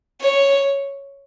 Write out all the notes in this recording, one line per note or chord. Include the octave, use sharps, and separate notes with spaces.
C#5